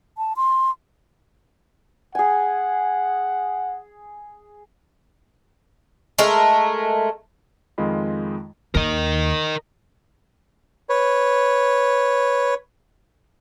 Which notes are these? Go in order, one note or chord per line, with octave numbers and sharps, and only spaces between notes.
A5
C6
G#4 F#5 G#5
G#3 A3 A#4
F2 D#3 G#3 F4 D#5 B5
D#2 A#4 D#5
B4 C#5